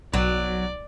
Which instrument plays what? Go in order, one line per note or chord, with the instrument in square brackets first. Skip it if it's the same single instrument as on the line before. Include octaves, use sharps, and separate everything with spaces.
[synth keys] B1 [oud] F#3 [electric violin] D5